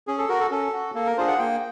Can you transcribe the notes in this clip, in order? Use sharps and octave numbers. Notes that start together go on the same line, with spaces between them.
C#4 G#4
A4
F#4 A#4
A4
C#4 A4
F#4
A#3 A4
A#4
D4 F4 G#4 C5
F#5
A#3 G5